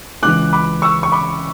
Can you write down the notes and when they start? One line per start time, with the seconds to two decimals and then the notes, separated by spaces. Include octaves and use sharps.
0.23 C#2 C#3 E3 D6 F#6
0.53 B5 D6
0.82 C#6 E6
1.03 C#6
1.12 B5 D6